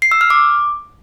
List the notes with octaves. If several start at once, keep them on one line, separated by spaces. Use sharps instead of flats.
C7
E6
F6
D6